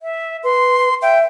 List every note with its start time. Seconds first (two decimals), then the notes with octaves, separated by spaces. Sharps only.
0.01 E5
0.44 B4 C6
1.02 E5 G5